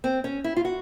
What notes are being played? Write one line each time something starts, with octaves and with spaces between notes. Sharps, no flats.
C4
C#4
E4
F4
F#4